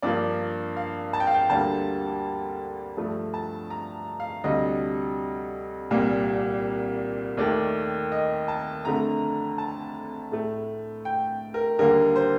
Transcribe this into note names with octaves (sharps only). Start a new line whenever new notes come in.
G2 F3 A#3 D5
F5
A5
G5
F5
G5
D2 D3 G3 A#3 A5
G2 F3 A3
A5
A#5
F5
D2 C3 G3 D#5
C2 A#2 G3 A#3
D#2 D#3 A3 D5
D#5
A5
F2 D3 A3 A#5
A5
A2 A3
G5
A#4
D#2 D3 G3 A#3 A#4
C5